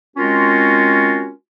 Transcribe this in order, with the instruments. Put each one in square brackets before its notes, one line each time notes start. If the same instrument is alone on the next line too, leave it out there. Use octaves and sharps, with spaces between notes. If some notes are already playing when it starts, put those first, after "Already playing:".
[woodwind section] G#3 C4 C#4 F4 F#4 A#4